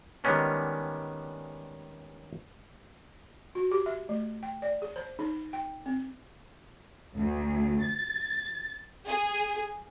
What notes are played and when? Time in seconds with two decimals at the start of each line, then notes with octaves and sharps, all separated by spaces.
0.24 D#3 G3 G#3 B3 C#4 D4
3.55 F#4
3.72 G4
3.86 E5
4.09 A3
4.43 G5
4.62 D5
4.82 G#4
4.96 C5
5.19 D#4
5.53 G5
5.86 C4
7.15 D2
7.82 A6
9.08 G#4